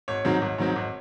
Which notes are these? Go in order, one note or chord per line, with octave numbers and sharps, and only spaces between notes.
G#1 C#5
G#2 D#3 F#3 C4
G#1
G#2 D#3 F#3 C4
G#1